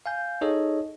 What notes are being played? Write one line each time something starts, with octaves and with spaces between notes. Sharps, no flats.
F5 G#5 G6
D#4 G#4 A4 C#5 D#5